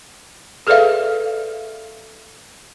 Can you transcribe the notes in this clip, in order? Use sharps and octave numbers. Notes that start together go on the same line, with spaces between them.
G#4 A4 B4 D5 E5 F5